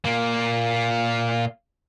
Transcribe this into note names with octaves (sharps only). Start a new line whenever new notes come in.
A#2 A#3